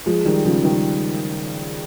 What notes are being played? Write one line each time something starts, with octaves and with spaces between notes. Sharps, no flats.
F3 G#3
D#3 G3
C#3 F3
D#3 G3